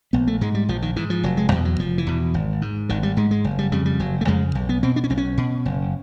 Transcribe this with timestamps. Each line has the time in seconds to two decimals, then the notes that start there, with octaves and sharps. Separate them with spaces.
0.13 A#1 B3
0.27 A3
0.41 G#2 G#3
0.55 G3
0.69 A#1 F3
0.82 D#3
0.96 G#2 E3
1.10 F3
1.23 F1 F#3
1.37 G#3
1.52 E2 B2 G3
1.65 F#3
1.79 F1 F3
1.98 E3
2.07 E2 B2
2.34 G#1
2.62 G#2
2.89 G#1 D#3
3.03 G3
3.17 G#2 G#3
3.31 G#3
3.44 F#1
3.59 G3
3.72 F2 C#3 G3
3.86 G3
4.00 F#1 F#3
4.21 A3
4.27 F2 C#3 G#3
4.55 B1
4.69 B3
4.83 B2 C4
4.96 D4
5.04 C#4
5.10 B1 C4
5.18 C#4
5.38 B2
5.65 F#1